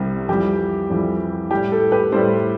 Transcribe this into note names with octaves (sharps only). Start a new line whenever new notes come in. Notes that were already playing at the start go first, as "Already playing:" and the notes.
Already playing: C2 C3 G3
F2 E3 G3 G4
F2 E3 G3
A2 G3 G4
A4
G4 B4
A2 G3 A4 C5